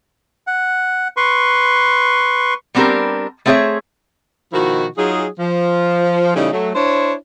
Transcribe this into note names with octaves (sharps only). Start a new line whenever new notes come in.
F#5
B4 C6 C#6
G3 B3 C4 D4 G4 A#4
A3 B3 C4 G#4 C#5 E5
B2 D#3 F3 E4 F#4
F#3 D#4 F4 G#4
F3
C#3 E3 G3 A3 C#4 D#4
F#3 A3
D4 E4 C5 C#5